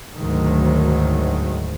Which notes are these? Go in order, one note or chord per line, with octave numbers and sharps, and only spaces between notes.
D2 G#2 D#3 F#3